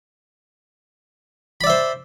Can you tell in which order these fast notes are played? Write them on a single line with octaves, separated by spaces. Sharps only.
B5 D5 E5 C5